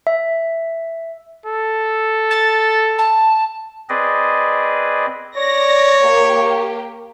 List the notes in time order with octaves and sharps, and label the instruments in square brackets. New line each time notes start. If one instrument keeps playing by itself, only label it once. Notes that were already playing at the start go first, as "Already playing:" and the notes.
[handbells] E5
[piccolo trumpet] A4
[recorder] A6
A5
[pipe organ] C4 G#4 B4 D5 D#5
[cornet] C#5 [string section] D5 A#6
[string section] A#3 G4